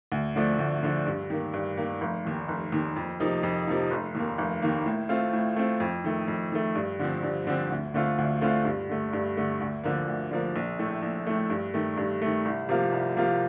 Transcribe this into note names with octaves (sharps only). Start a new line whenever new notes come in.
D2
D3 F3 A3 D4
D2
D3 F3 A3 D4
G2
D#3 A#3
G2
D#3 A#3
F1
D#2 D#3
F1
D#2 D#3
F2
C3 F3 A#3 D#4
F2
C3 F3 A#3 D#4
F1
D#2 D#3 A#3
F1
D#2 D#3 A#3
A2
A3 C4 F4
A2
A3 C4 F4
F2
D#3 A3
F2
D#3 A3
G2
D3 F3 C4
G2
D3 F3 C4
D2
D3 A3 C4 F4
D2
D3 A3 C4 F4
G2
D3 A3
G2
D3 A3
D2
D3 F3 A#3
D2
D3 F3 A#3
A#1
A2 A3
A#1
A2 A3
G2
D#3 A3
G2
D#3 A3
C2
C3 F3 A#3 F4
C2
C3 F3 A#3 F4